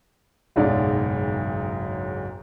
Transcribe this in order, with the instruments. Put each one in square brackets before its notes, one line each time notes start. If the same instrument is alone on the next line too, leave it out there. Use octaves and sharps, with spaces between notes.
[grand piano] F#1 B1 G#2 D5